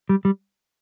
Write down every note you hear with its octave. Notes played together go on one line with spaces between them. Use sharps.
G3
G3